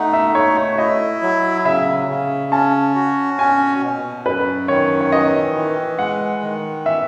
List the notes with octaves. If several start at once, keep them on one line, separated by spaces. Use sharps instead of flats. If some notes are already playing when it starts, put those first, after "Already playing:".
Already playing: A3 D#4 F#5
E5
A3 C#5
C#5
E4 D#5
F#3
C#3 E5
C#3
C#4 A5
F#4
C#4 G#5
B2
F#2 B4
D#3 C#5
C#5
E3 D#5
E3
G#3 F#5
D#3
E3 E5